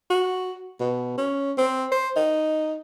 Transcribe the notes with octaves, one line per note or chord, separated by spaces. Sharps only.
F#4
B2
C#4
C4
C5
D#4